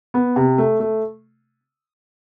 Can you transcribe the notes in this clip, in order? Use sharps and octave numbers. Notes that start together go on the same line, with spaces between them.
B3
C3
A3
A3